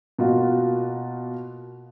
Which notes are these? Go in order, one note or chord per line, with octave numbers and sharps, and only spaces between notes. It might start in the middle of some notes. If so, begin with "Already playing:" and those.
B2 A#3 F4 F#4